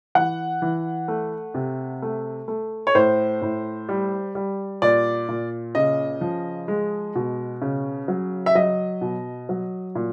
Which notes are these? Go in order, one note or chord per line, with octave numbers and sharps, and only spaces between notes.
E3 F#5
E3
A3
C3
A3
A3
C#5
A2 C5
A2
G3
G3
A#2 D5
A#2
C#3 D#5
F3
G#3
B2
C#3
F#3
E5
F#3 D#5
B2
F#3
A#2